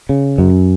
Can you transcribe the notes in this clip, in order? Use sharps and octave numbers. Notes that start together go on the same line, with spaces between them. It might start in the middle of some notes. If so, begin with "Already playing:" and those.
C#3
F#2